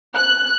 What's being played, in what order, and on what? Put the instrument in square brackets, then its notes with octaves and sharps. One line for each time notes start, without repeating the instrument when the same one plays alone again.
[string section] F#6